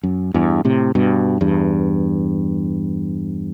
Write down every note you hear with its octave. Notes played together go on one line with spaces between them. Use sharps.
F#2
E2 G2
A2 C3
G2 B2
E2 G2